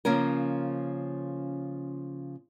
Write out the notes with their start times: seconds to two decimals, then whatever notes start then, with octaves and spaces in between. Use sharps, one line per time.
0.05 C#3 F3 A#3 C#4 A#4